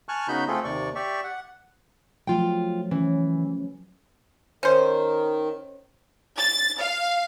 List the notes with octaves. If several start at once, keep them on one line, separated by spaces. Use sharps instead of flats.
G#5 A5 C#6 F6 F#6
C#3 B3 D#4 F#4 B5 G6
A3 C4 F4 G#4 A4
D#2 C3 D5 C#6
G4 D5 E5 C#6
F#5
F3 F#3 A3 F4 G5
E3 C#4
D#3 C#4 C5
A6
F5